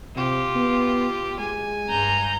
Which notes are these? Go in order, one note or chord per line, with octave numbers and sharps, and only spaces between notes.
C3 F4 G4
B3
G#3 G#5
G2 A#5 G6